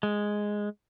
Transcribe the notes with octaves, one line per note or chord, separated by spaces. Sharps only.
G#3